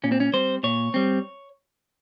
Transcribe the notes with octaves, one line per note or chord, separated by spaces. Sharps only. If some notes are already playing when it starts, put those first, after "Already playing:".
A#2 C#4
C4
C#4
G3 C4 C5
A#2 C#5
G3 C4